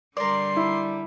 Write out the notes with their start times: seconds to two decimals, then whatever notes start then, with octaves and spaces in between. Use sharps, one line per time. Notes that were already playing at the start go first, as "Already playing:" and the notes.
0.17 D3 G3 A#4 D5 C6
0.56 E4